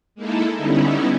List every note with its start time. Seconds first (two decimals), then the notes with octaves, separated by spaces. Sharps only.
0.15 G#3 A#3 D#4 E4 A4
0.58 D3 G3 B3 C#4 D#4 E4